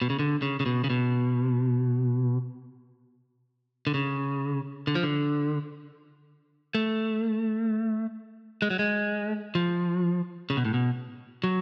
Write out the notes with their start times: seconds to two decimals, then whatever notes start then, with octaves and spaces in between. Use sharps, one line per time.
0.02 B2
0.10 C#3
0.19 D3
0.42 C#3
0.60 C#3
0.66 B2
0.84 C#3
0.90 B2
3.87 D3
3.94 C#3
4.87 D3
4.95 F3
5.03 D3
6.75 A3
8.62 G#3
8.70 F#3
8.79 G#3
9.55 F3
10.50 C#3
10.57 B2
10.65 A2
10.74 B2
11.44 F#3